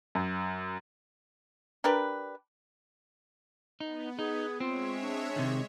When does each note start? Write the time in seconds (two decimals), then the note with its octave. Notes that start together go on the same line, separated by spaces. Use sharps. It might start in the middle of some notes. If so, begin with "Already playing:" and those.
0.15 F#2
1.84 D4 G4 A#4 B4
3.80 B3 D#4
4.19 D#4 G#4
4.60 G#3 C4 F4 C#5 E5
5.01 D4
5.36 C3 D#3